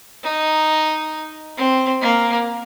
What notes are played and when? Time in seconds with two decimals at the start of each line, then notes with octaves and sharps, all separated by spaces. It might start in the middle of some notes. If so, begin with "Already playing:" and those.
0.24 D#4
1.57 C4
2.01 A#3